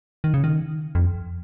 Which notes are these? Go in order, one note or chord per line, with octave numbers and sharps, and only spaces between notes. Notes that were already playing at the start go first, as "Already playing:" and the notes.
D#3
C#3
D#3
F2